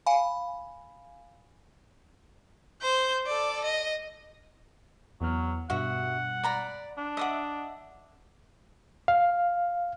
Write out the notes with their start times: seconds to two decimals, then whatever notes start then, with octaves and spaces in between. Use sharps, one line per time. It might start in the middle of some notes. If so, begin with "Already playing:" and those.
0.06 F5 G#5 B5
2.82 C5 G6
3.26 A4 D5
3.65 D#5
5.21 E2 F#3 B3 F6
5.70 G2 B2 F#4 E5 F#5
6.44 D5 A#5 B5
6.97 D4
7.17 D#5 E5 F#5 D6 D#6
9.08 F5